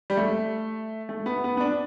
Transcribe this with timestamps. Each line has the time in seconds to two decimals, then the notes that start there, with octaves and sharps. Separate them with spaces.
0.10 G3
0.17 A3
1.09 A3
1.26 B3
1.44 B3
1.57 B3
1.60 D4